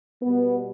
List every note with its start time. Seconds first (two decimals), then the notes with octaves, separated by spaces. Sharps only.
0.22 B2 G3 B3